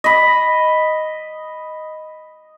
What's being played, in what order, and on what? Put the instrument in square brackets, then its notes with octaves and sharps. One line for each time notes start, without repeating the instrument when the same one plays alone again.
[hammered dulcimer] D#5 B5